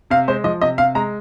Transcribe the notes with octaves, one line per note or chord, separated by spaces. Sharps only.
C3 F5
G#3 C5
F3 D#5
C3 D#5
C3 F5
G#3 A#5